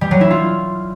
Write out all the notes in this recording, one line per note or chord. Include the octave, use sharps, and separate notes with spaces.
G3
F#3
E4
F4